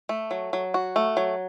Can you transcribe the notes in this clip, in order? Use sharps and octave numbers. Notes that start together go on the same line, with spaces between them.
A3
F#3
F#3
F#4
A3
F#3